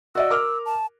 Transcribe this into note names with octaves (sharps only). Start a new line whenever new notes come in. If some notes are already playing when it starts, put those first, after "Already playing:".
F#4 D5 D#5 E6
A#4 D6 F6
A5